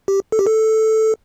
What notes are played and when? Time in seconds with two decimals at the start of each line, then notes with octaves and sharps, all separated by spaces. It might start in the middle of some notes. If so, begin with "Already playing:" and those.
0.08 G4
0.32 A4
0.39 G4
0.46 A4